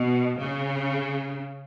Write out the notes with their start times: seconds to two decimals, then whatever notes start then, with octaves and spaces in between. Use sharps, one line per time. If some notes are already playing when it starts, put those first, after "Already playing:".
Already playing: B2
0.39 C#3